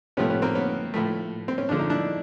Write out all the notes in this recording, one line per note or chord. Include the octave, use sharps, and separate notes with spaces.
C3 F3 A3 B3 C#4
B3 C#4
A#3 C4
B3 C#4
A2 F3 A3
C4
C#4
D3 F3 G#3 D4
D#4
D4 E4